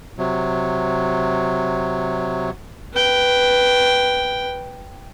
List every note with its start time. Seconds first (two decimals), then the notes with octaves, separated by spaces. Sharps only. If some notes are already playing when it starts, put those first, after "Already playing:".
0.18 C3 F#3
2.93 B4 G5